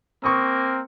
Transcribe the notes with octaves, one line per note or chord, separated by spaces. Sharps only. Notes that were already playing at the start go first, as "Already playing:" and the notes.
A#3 C4 C#6 D#6